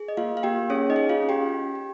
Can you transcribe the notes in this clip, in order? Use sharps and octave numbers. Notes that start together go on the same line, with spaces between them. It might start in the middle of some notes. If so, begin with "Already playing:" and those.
Already playing: G#4
D#5
A#3 F4 F5
F5
A#3 G4 G5
C#4 G#4 C#5
D#4 D#5
G#4
F4 F5
C#4
G4 G5
G4
G4